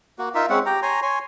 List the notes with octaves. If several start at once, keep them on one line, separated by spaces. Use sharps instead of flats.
A#3 F#4
D#4 F4 A#4 E5
G#3 C4 C#4 F#5
G4 G5 A#5
C#5 G#5 A#5 C6
C#5 G#5 C6